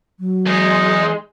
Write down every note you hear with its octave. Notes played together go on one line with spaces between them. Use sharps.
F#3
E2 G#3 D#4